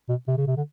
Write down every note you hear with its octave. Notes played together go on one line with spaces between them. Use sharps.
B2
C3
C#3
C3
D3